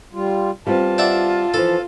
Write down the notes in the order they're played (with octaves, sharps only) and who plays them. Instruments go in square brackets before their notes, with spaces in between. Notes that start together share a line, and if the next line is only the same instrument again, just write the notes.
[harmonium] G3 F4
[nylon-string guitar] G3 B3 C4 [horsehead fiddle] F4 [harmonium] A5
[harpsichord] D4 E5 F#5
[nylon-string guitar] E3 F3 [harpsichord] A4